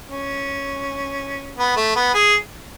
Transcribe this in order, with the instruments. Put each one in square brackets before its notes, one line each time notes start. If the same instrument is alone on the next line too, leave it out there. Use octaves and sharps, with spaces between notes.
[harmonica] C#4
B3
A3
B3
G#4